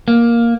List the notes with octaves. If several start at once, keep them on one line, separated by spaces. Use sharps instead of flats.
A#3